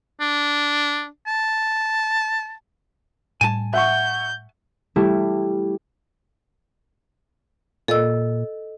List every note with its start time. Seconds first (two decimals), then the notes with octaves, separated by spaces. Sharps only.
0.20 D4
1.27 A5
3.41 A2 G3 G#5 A5
3.74 E5 F#5 C#6 G6
4.96 G3 A3 E4
7.88 A#2 A4 D#5 E6